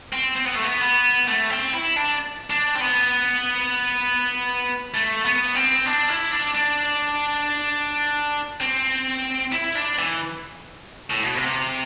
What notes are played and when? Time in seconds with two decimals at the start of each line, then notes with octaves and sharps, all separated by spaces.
0.13 C4
0.36 C4
0.45 B3
0.55 A3
0.65 B3
0.82 B3
1.27 A3
1.50 C4
1.73 E4
1.96 D4
2.50 D4
2.75 C4
2.80 B3
4.94 A3
5.25 B3
5.55 C4
5.86 D4
6.09 E4
6.32 D4
6.54 D4
8.61 C4
9.52 E4
9.75 D4
9.98 E3
11.10 A2
11.24 B2
11.36 C3